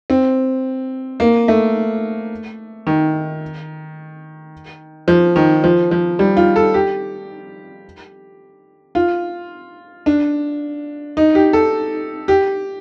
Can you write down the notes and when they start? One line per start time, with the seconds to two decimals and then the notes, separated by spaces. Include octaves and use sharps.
0.10 C4
1.20 A#3
1.48 A3
2.87 D#3
5.08 F3
5.36 D#3
5.64 F3
5.91 F3
6.19 G3
6.37 F4
6.56 A4
6.74 G4
8.95 F4
10.06 D4
11.17 D#4
11.35 G4
11.53 A4
12.28 G4